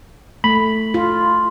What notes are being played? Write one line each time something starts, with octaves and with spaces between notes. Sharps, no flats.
A3 B5
F4